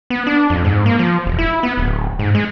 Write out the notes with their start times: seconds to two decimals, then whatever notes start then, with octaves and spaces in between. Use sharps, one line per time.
0.10 B3
0.27 D4
0.50 F2
0.65 G#2
0.86 A#3
0.99 F3
1.26 E1
1.39 E4
1.63 B3
1.77 D1
2.19 G#2
2.35 G#3